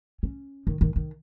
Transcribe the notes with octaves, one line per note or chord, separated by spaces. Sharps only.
C#4
D#3
D#3
D#3